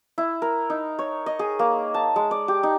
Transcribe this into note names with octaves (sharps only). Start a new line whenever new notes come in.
E4
A#4
D#4
C#5
D#5
G#4
A#3
A5
G#3
D5
G4
D#4